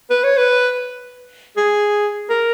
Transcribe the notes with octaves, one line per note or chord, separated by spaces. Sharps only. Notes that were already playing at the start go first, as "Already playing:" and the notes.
B4
C#5
B4
G#4
A#4